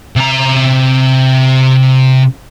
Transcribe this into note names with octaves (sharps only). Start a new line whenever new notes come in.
C3 A#5